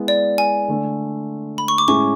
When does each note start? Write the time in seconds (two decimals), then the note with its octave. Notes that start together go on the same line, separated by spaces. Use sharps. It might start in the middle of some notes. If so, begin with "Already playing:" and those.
Already playing: G#3 B3 E4
0.08 D5
0.38 G#5
0.68 D3 A3 D4
1.58 B5
1.68 C#6
1.78 D6
1.88 A2 G#3 C#4 E4 G#4 C#6